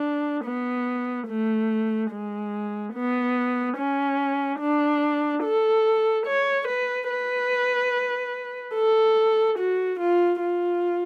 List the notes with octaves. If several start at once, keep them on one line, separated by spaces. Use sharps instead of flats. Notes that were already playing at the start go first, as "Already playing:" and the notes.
Already playing: D4
B3
A3
G#3
B3
C#4
D4
A4
C#5
B4
B4
A4
F#4
F4
F4